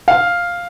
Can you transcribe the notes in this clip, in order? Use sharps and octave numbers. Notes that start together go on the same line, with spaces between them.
F5